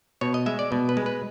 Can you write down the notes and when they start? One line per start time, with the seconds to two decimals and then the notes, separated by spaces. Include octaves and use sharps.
0.21 B2 C#5
0.34 D#5
0.46 G#3 E5
0.59 D5
0.72 B2
0.89 B4
0.97 G#3
1.06 B4